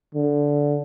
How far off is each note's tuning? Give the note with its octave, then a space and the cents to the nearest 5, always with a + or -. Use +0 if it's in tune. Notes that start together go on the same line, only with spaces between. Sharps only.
D3 -10